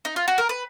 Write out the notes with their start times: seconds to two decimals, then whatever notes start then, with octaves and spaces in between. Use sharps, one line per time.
0.05 D#4
0.16 F4
0.28 F#4
0.38 A#4
0.49 B4